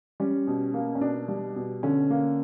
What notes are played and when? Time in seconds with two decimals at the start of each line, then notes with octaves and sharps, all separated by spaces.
0.20 G3 C#4
0.47 B2
0.74 A#3
0.95 C#4
1.01 B2 D4
1.28 G3
1.56 B2
1.83 D3 C#4
2.10 A#3